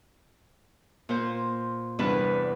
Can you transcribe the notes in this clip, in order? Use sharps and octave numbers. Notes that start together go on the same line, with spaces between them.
A#2 C5
E2 G2 C3 D4 B4